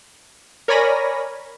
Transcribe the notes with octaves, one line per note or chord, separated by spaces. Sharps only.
A#4 C#5 D5 G#5 B5 A#6